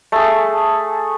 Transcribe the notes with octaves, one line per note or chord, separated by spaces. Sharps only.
A3 G#4